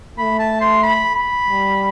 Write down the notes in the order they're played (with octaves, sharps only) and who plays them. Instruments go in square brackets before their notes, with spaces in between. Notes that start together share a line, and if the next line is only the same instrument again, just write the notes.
[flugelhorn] A3 [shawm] B5
[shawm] A5
C6
B5
B5
[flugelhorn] G3